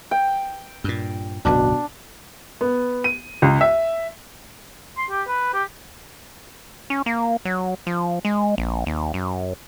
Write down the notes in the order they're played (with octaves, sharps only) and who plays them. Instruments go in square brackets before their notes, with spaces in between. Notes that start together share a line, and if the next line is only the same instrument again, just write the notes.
[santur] G5
[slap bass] G2 A#2
[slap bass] D1 B1 F#2 [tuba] B2 [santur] D4
[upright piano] B3
D#7
C#2
E5
[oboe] C6
G4
B4
G4
[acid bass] C#4
A#3
F#3
F3
G#3
A#1
D#2
F#2